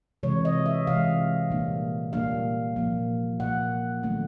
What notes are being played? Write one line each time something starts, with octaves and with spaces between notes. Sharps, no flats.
C3 E3 G#3 C#5
D#5
E5
C3 E3 G#3 F5
A#2 G3 A#3 D4
A#2 G3 A#3 D4 F5
A#2 F3 A#3
A#2 F3 A#3 F#5
D#3 F#3 A3 C#4